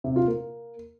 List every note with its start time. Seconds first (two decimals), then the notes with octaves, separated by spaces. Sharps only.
0.04 C3
0.16 F4
0.28 A#3